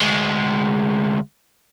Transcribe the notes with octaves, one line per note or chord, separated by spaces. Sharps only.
D2 G#3